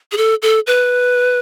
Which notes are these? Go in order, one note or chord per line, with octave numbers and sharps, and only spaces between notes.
G#4
A4
A4
B4